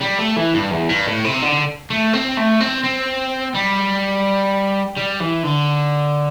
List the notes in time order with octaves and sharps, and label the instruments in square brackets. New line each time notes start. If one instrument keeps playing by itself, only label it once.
[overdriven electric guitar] G3
A3
E3
G2
E2
G2
A2
C3
D3
A3
C4
A3
C4
C4
G3
G3
E3
D3